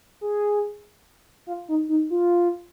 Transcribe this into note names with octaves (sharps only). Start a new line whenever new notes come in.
G#4
F4
D#4
D#4
F4